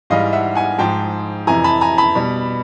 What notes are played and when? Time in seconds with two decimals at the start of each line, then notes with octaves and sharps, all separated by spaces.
0.10 G#2 E3 G3 D#5 F5
0.33 E5 F#5
0.55 F#5 G#5
0.78 G#2 F3 G#3 G5 A5
1.47 F2 C3 E3 G#5 A#5
1.64 A5 B5
1.81 G#5 A#5
1.98 A5 B5
2.15 B2 G3